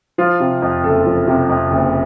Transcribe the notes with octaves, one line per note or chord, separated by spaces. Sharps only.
F3 F4
C3
F2
F#1 A4
F3
C3
F2
F#1